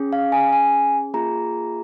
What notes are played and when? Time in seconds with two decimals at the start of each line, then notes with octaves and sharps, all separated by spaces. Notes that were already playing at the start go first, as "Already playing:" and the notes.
Already playing: C#4 G#4
0.13 F5
0.32 G#5
0.53 G#5
1.14 A#3 F4 G#4 A#5